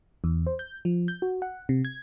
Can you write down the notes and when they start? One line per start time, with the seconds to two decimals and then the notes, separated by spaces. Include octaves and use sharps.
0.24 E2
0.47 C5
0.59 G6
0.85 F3
1.08 G6
1.22 F#4
1.42 F#5
1.69 C3
1.85 G#6